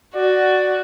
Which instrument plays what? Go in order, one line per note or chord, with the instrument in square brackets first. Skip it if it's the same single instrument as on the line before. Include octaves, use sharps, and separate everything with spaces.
[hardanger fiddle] F#4 [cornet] D5